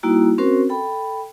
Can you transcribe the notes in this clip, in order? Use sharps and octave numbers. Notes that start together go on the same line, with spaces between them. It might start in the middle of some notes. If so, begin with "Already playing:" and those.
G3 A#3 D#4 E4 F#4
C4 C#4 F#4 A#4 C5
A4 G5 B5